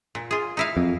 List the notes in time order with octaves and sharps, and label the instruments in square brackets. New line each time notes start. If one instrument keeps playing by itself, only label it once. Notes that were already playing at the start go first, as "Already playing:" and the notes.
[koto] A#2
F4 G#4
D#4 E4 F5
[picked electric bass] F2